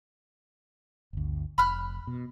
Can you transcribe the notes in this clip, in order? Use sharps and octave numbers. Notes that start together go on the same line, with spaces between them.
G1 D2
F1 B5 F6 F#6
B2